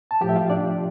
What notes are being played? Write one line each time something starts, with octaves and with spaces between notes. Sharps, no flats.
A5
A2 F3 G4 G5
E5
F4 F5
D4 D5